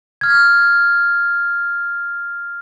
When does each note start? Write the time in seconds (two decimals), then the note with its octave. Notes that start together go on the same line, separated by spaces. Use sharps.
0.21 F6 G#6